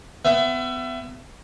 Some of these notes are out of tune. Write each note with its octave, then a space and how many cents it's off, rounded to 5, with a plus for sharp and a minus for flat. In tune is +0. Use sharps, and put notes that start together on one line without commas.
B3 +35 E5 +30